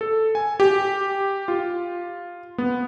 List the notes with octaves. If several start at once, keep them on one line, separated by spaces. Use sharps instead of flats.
A4
G#5
G4
F4
B3